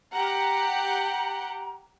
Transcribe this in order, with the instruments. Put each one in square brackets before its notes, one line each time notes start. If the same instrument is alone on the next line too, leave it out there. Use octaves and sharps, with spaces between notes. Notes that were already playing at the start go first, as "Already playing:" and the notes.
[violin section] G4 F#5 [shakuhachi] A#5